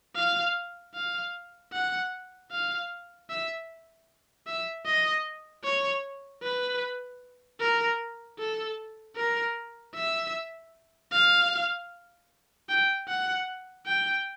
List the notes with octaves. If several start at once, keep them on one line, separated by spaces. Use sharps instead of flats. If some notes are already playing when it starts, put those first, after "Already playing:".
F5
F5
F#5
F5
E5
E5
D#5
C#5
B4
A#4
A4
A#4
E5
F5
G5
F#5
G5